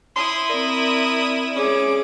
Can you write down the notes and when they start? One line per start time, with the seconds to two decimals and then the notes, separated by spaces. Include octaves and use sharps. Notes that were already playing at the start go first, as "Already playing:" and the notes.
0.16 E4 C6 D#6
0.49 C4 A#4 D5
1.56 C#4 G#4 D6